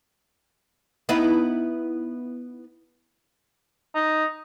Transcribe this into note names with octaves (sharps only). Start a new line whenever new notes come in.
B3 D#4 E4
D#4